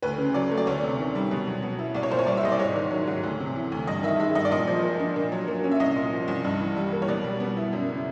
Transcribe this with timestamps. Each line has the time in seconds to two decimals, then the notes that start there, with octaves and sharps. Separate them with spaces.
0.02 D2 B4
0.18 C#3
0.34 F#3 D5
0.51 A3
0.57 D5
0.67 D2 C#5
0.83 C3
0.99 D#3
1.15 G3
1.31 B2
1.47 F#3
1.62 B3
1.79 E4
1.95 C2 D5
2.03 C#5
2.11 A#2 C5
2.19 C#5
2.27 G3 D5
2.37 E5
2.43 C2 D#5
2.52 D5
2.59 G#2 C#5
2.76 D#3
2.91 F#3
3.07 G#2
3.23 D2
3.40 C3
3.56 E3
3.72 D2
3.87 G2 D#5
4.03 D#3 E5
4.20 G#3 E5
4.35 G2 D#5
4.45 D5
4.51 A#2 D#5
4.67 F3
4.83 A#3
4.99 D4
5.16 A#2
5.32 F#3
5.48 A#3
5.64 C#4
5.71 E5
5.80 C2 D#5
5.96 A#2
6.13 F3
6.28 C2
6.44 G2
6.60 E3
6.77 G3
6.93 A#3
7.02 C#5
7.08 B2 D5
7.24 G3
7.40 B3
7.57 E4
7.73 F#2
7.89 C#3